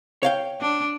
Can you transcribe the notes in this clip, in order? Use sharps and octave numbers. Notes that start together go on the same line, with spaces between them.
C#5 F5 G5
D4